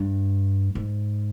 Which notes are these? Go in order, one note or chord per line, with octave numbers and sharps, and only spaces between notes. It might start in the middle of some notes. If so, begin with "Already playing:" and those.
Already playing: G2
G#2